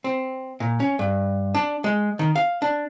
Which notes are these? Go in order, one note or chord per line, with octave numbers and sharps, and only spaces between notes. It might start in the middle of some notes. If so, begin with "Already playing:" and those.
C4
A#2
C#4
G2
D4
G#3
D#3
F5
D4